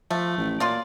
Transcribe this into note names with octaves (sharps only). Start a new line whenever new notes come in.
F3 A3
A1
A#2 F#3 F4 D5